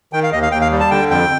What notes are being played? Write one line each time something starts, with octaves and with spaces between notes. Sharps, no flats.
D#3 G5
F5
D#2 D#5
F5
D#2 G5
F5
G3
A5
D3 G5
F2 G5